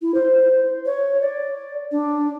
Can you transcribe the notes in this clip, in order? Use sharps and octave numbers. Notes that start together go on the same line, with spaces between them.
E4
C5
C#5
D5
D4